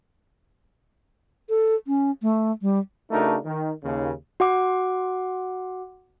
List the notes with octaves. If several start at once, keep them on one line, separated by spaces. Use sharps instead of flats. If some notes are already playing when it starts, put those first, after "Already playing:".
A4
C#4
A3
G3
C#3 A3 D4 D#4 F#4 A#4
D#3
D#2 C#3
F#4 F#5 D6